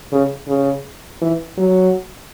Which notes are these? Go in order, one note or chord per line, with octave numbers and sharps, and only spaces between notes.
C#3
C#3
E3
F#3